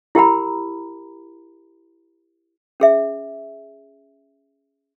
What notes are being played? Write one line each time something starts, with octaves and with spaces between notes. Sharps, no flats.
E4 G4 A#4 A#5 B5
C#4 G#4 E5